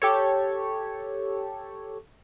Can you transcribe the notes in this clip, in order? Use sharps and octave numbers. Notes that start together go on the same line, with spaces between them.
G4 A4 C#5